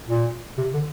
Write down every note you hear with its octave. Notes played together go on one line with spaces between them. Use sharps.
A#2
C3
D3